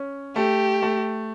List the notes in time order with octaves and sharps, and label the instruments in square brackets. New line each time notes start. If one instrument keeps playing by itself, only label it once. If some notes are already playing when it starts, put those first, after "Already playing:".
Already playing: [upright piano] C#4
[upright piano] A3 [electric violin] G4
[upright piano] A3